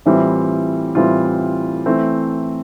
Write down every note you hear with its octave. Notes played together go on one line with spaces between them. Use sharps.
A2 E3 G3 C4 F4
A2 E3 G3 C4 F4
E3 A3 C4